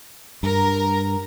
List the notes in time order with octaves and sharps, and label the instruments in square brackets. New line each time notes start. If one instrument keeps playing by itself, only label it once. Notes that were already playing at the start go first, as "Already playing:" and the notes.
[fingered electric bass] G2 [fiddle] A#4 A#5